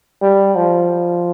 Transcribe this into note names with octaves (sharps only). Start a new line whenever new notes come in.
G3
F3